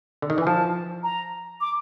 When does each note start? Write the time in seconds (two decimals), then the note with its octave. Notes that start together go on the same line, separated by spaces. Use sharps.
0.22 D3
0.30 D#3
0.38 E3
0.41 G#5
0.46 F3 A5
1.03 A#5
1.61 D6